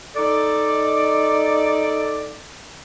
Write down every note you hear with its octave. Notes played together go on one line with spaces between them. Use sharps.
D#4 A4 D5